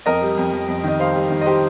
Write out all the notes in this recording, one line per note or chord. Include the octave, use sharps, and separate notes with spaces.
F2 A#4 D#5
G3
F2
F2
F2
D#3 D#5
G3 C5 F5
G3
D#3
D#5
G4 C5